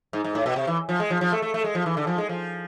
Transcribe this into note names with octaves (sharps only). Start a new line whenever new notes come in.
G#2
G#2
A2
B2
C3
E3
F3
G#3
F3
F3
A3
A3
A3
G#3
F3
E3
D3
F3
G#3
F3